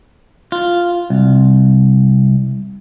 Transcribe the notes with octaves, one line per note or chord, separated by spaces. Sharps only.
F4
C2